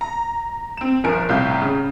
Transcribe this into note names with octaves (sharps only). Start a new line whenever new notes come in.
A#5
C4 E7
G1 F3 A#4 G#5 D7
C2 A2 F4 G6
C#3